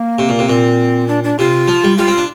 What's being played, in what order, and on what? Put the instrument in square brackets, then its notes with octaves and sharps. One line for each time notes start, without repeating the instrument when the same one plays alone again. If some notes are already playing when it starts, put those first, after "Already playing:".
Already playing: [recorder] A#3
[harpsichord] C3
A#2
C3
[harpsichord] A#2 [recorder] C4
[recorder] D4
D4
[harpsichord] C3 [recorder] F4
[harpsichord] F3
G3
[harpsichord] G3 [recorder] F4
[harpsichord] C4
D4